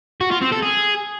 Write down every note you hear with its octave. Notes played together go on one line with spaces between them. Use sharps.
F#4
F4
C4
A4
G#4